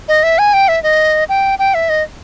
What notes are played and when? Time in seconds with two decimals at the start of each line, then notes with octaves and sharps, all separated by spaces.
0.08 D#5
0.23 E5
0.39 G#5
0.54 G5
0.68 E5
0.83 D#5
1.29 G5
1.59 G5
1.74 E5
1.89 D#5